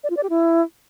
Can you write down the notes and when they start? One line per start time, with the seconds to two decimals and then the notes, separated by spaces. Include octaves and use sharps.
0.04 D5
0.10 F4
0.17 D5
0.23 G4
0.30 E4